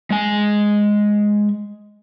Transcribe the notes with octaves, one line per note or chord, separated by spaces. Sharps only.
G#3 G#5